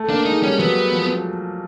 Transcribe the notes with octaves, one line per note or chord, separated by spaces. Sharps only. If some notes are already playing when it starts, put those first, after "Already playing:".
Already playing: A3
A#3 D4
G#3 D#4
G3 C#4
F#3 B3
F3